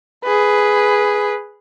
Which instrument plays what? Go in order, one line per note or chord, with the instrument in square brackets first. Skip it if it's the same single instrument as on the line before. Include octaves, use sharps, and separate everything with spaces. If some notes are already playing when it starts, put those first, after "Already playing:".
[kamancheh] G#4 B4